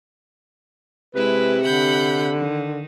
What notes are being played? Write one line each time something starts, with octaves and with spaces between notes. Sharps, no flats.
C3 G#3 E4 B4
D3 F#5 B5 G6
D#3